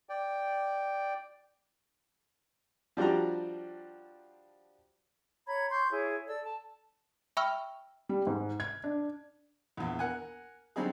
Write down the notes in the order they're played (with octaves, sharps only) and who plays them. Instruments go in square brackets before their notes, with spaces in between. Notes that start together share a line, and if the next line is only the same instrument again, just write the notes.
[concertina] D5 G5
[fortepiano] F3 G3 D4 F#4 A#5
[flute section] C#5 A#5 B5 G#6
C6 C#6 G6
E4 G#4 C#5
A4 D5 E6
A5
[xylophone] E5 G5 B5 C#6 E6 F6
[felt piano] G3
G#2
G#6
D4
[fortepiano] A#1 E2
A#4 F#5 G#5
D3 F#3 G3 C4 D#4 G#4